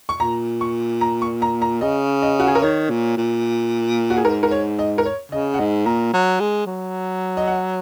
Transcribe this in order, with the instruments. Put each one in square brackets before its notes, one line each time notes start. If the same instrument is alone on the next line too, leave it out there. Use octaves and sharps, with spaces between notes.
[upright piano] C#6
[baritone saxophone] A#2 [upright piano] A#5
[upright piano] C#6
A#5
C#6
A#5
A#5
[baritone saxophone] C#3 [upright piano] D#5
[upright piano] D#5
F#4
G#4
A#4
[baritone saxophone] D#3 [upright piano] C#5
[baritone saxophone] A#2
A#2
[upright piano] F#4
G#4
[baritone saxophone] G#2 [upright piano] A#4
[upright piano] A#4
C#5
D#5
A#4
C#5
[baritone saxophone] C#3 [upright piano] D#5
[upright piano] F#5
[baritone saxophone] G#2 [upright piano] D#5
[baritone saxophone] A#2 [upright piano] A#5
[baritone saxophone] F#3
G#3
F#3
[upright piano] D#5
F#5